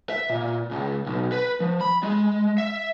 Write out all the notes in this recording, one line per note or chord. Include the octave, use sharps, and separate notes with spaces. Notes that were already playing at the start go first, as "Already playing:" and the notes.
E5
A#2
C#2
B1
B4
F3
B5
G#3
E5